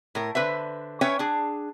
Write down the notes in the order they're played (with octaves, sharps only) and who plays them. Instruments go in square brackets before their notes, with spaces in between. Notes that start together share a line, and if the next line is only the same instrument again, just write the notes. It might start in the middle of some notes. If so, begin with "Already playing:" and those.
[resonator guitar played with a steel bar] A2 A#4
D3 B4 C5 E5
C#4 B4 C#5 E5 G5
D4 G#4